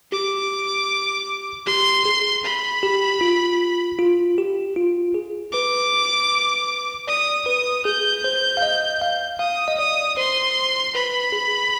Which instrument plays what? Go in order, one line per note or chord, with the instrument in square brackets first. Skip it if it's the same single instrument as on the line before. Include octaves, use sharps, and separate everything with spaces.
[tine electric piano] G4 [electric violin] D6
[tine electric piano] G4 [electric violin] C6
[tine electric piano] G#4
[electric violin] B5
[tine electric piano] G4
F4
F4
G4
F4
G#4
[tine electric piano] B4 [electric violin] D6
[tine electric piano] D5 [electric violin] D#6
[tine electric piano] B4 [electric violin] D#6
[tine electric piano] G#4 [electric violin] G6
[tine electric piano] C5
F5
D#5
F5
[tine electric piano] F5 [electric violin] D#6
[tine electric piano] D#5
[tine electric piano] D5 [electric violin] D#6
[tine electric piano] C5 [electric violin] C6
[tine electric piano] B4 [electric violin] B5
[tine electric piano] G#4